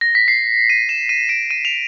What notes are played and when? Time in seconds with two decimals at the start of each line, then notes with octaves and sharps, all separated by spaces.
0.01 A#6
0.15 B6
0.28 C7
0.70 D#7
0.89 E7
1.09 D#7
1.29 D7
1.51 D#7
1.65 F7